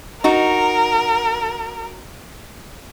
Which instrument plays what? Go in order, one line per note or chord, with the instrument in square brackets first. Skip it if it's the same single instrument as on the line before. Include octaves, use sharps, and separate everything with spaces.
[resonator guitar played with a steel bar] D#4 F#4 [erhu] A#4